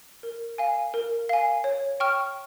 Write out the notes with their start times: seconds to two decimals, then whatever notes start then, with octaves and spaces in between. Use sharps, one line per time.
0.23 A#4
0.58 F5 G#5
0.94 A#4
1.29 F5 G#5
1.64 C#5
2.00 G5 C#6 F6